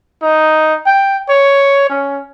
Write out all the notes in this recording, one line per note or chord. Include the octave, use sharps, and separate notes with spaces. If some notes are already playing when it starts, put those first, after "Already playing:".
D#4
G5
C#5
C#4